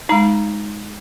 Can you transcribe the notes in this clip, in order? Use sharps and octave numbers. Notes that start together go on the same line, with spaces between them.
G#3 D#4 A#5